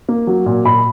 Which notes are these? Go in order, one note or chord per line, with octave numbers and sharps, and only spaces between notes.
A#3
F#3
A#2
A#2 B5